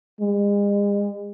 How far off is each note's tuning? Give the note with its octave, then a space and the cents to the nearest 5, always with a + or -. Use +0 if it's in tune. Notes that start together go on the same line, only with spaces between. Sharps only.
G#3 -40